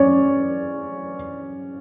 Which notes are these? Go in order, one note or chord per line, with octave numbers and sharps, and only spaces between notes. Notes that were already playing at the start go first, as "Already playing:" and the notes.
Already playing: C#4 C#5 D5